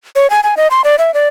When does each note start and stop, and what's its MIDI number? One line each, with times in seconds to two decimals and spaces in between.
0.16 0.30 73
0.30 0.40 80
0.43 0.55 80
0.57 0.68 75
0.71 0.81 84
0.84 0.96 74
0.98 1.13 76
1.14 1.28 74